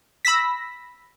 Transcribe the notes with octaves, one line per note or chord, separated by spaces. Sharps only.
B5 E6 A#6 B6